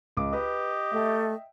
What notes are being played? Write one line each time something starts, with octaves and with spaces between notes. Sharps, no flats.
C#2 D6
G4 B4 D#5
A3 E5 G5